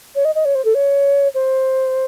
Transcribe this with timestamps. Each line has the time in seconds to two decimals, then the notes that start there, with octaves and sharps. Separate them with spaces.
0.15 C#5
0.25 D#5
0.35 D#5
0.45 C#5
0.55 C5
0.65 A4
0.75 C#5
1.35 C5